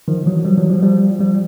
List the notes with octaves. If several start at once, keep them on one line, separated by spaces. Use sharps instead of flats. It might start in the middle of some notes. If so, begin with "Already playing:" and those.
D#3 F3
E3 F#3
F#3
F3 G3
E3 F#3
F3 G3
F3 G3
F3 G3